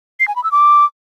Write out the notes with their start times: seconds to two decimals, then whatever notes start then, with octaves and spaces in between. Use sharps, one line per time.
0.20 C7
0.28 G#5
0.36 B5
0.44 E6
0.52 D6